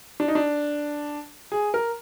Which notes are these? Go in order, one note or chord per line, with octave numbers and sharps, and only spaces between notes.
D4
D#4
D4
G#4
A#4